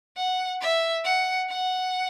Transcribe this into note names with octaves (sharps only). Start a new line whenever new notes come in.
F#5
E5
F#5
F#5